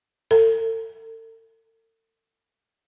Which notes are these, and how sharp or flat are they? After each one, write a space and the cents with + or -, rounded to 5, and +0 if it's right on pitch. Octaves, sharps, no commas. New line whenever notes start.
A4 +40